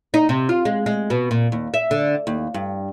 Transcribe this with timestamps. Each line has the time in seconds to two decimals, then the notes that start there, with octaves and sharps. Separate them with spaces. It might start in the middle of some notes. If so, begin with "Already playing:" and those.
0.14 D#4
0.29 C3
0.49 F4
0.65 G#3
0.86 G#3
1.10 B2
1.31 A#2
1.52 D#2
1.74 E5
1.91 D3
2.27 D#2
2.54 G2